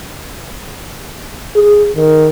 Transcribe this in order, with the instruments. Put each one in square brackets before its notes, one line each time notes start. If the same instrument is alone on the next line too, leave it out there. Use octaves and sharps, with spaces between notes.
[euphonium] G#4
D#3